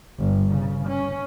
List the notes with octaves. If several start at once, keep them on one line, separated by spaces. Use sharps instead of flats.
G1
C#3
C#4